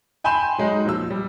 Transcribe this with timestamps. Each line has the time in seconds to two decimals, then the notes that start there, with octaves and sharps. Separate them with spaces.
0.24 G5 G#5 B5 C6 G6 E7
0.58 F#3 G#3 D#4
0.85 A#2 F3 E6
1.11 G3